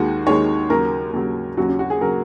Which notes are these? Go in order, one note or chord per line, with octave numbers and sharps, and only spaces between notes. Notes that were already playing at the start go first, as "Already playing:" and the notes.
Already playing: D#2 D#3 G#3 F#4
D#2 D#3 G#3 C#5
D#2 C#3 F#3 A#4
D#2 C#3 F#3
D#2 C#3 F#3 F#4
C#4
F#4
G#4
C#3 F#3 A#4